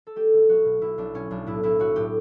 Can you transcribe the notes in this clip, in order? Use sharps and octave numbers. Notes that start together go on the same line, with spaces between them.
A4
A3 G4
B1
B1 F#4
B2
B2 E4
B1 D4
B2 C#4
B1 D4
A2 E4
B1 E4
B1 F#4
A2 G4